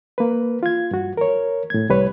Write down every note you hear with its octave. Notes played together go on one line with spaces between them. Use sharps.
A#3 B4
F4 G#6
G2 F#4
A#4 C#5
A2 G#6
C2 G3 B4 C#5